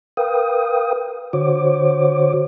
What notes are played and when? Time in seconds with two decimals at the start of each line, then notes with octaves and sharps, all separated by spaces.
0.17 A#4 B4 F5 G5 D#6
1.33 D3 F#4 C5 C#5 D6